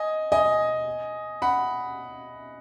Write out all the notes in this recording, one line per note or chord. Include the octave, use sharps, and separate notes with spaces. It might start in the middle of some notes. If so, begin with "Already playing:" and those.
Already playing: D#5 G#5
D#5 G#5
F#5 B5